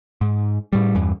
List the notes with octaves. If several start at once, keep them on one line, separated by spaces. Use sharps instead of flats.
G#2
A2 G3
E2 G2